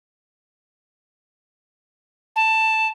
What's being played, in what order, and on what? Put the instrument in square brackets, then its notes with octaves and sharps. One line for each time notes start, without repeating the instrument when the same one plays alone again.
[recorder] A5